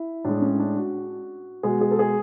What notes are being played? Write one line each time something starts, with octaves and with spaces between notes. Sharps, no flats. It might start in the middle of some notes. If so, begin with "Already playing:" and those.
Already playing: E4
A2 G#3 D4
C#4
D4
F#4
B2 G#3 G#4
G#4
A4
G#4